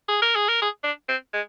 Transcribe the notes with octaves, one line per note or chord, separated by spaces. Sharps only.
G#4
A#4
G#4
A#4
G#4
D4
C4
G#3